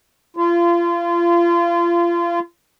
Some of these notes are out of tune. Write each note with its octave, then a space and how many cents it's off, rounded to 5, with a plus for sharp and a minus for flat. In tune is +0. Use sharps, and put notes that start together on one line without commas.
F4 -30